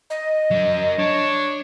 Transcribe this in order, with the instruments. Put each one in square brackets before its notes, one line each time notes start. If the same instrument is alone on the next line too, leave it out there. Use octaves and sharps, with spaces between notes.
[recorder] D#5
[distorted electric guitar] F#3 A#4
[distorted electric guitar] D4 [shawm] C#5